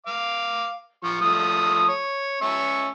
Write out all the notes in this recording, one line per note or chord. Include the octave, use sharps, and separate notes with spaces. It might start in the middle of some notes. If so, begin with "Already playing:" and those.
F5 D6
F3 C#6
F3 A3 D#6
C#5
C#4 E5 C#6